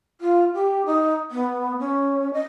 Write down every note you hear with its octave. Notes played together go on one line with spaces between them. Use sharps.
F4
G4
D#4
B3
C#4
D#5